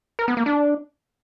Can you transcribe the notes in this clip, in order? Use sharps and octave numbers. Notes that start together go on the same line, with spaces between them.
A#4
B3
A#3
D4